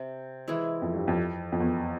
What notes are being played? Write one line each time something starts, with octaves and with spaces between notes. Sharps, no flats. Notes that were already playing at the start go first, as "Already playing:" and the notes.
Already playing: C3
E3 G#3 E4
F2
G2
F2
F2
E2